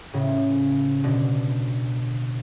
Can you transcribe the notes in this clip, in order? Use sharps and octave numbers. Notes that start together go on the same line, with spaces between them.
A2 C#3
B2 D3